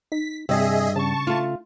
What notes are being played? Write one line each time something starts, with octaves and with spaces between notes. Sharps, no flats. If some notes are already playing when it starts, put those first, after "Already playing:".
D#4 B6
G2 C3 G#4 D#5 E5
C#3 A5 C#6
A3 F4